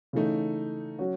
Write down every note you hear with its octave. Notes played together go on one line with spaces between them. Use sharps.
C#3 E3 A3 D#4
F#3 C#4 F#4